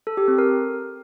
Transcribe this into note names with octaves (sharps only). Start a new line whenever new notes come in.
A4
G4
C4
A#4